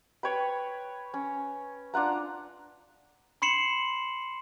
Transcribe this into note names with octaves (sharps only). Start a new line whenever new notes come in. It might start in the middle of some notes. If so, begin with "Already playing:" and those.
B4 C#5 G5 B5
C#4
D4 F4 F#5 A#5
B5 C6 C7 C#7 E7 F#7